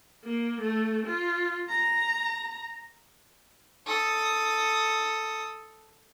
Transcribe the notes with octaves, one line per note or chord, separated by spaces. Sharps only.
A#3
A3
F4
A#5
A4 D#6